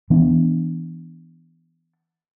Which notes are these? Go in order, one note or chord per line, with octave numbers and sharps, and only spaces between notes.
E3 B3 D4